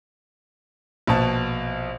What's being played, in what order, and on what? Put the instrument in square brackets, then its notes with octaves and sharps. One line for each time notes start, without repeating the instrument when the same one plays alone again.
[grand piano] A#1 B2 A5